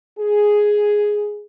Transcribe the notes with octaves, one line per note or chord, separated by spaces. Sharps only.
G#4